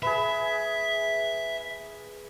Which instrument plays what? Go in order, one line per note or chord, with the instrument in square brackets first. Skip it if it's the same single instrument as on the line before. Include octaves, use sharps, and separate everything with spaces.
[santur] G#4 B4 [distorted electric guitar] E5